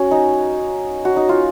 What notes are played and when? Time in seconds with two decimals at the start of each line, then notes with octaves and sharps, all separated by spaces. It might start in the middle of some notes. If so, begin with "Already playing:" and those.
Already playing: C#4 F#4
0.11 D#4
1.05 F#4
1.16 D#4
1.29 F4